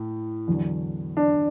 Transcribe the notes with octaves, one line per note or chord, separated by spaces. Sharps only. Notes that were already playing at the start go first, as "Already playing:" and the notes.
Already playing: A2
E2 D3 F#3
D4